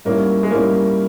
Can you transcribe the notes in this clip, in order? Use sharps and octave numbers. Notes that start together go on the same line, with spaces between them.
G#2 G3 A#3 C#4 E4
G#3
G#2 G3 A#3 C#4 E4